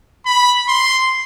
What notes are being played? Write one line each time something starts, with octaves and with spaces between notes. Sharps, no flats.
B5
C6